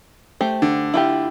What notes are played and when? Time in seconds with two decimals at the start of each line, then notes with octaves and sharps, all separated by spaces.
0.41 A3 G4 C5
0.62 D3
0.94 E4 F4 G4